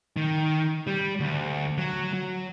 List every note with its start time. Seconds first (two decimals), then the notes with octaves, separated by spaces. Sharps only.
0.17 D#3
0.87 G3
1.20 D2
1.78 F#3
2.14 F#3